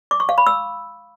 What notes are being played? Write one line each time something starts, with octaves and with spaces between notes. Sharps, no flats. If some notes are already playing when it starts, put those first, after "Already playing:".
D6
C#6
F5
B5
E6